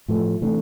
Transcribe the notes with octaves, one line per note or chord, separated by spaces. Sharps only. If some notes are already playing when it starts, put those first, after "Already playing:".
A2 F3 A3
C3 E3 A3 D4